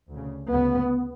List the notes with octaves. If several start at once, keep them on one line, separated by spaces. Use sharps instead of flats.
D2 C#3
D2 C#3 B3